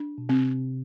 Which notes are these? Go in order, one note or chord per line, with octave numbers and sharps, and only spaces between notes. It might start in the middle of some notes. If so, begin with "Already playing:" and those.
Already playing: D4
B2
C3 C4